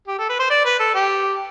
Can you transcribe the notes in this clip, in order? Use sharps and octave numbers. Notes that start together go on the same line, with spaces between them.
G4
A4
B4
C5
D5
B4
A4
G4